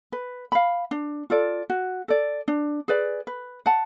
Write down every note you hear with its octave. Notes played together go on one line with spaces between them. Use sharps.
B4
F5 B5
D4
F4 A4 D5
F#4
A4 D5
D4
G#4 B4 D5
B4
F#5 A5